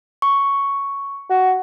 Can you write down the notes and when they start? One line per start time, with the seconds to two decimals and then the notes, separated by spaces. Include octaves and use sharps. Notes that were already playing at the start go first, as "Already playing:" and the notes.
0.22 C#6
1.29 F#4